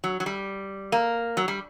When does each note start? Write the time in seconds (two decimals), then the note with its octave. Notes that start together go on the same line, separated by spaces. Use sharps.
0.04 F#3
0.20 F#3
0.26 G3
0.92 A#3
1.37 F#3
1.48 G3